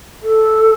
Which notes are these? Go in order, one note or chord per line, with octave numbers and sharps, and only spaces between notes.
A4